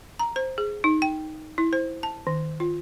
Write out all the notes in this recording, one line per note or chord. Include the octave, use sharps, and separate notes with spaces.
A#5
C5
G#4
D#4
G5
E4
C5
A5
D#3
F4